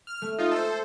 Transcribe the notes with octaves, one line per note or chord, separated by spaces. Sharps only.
F6
A3
D#4 F4
A4 C5